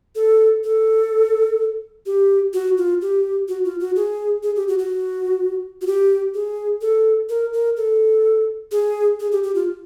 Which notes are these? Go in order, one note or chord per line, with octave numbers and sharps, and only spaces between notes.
A4
A4
G4
F#4
F4
G4
F#4
F4
F#4
G#4
G#4
G4
F#4
F#4
F#4
G4
G#4
A4
A#4
A#4
A4
G#4
G#4
G4
G4
F4